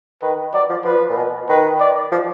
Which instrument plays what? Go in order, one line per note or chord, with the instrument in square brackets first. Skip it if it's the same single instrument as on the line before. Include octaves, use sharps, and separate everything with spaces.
[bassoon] D#3 [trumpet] B4
[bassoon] F#3 [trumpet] D5
[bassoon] F3
[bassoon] F3 [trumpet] B4
[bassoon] A#2
B2
[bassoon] D#3 [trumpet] B4
[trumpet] D5
[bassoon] F3